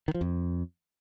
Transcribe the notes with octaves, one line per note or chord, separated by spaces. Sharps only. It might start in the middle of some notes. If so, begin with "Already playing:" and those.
D#3
F3
F2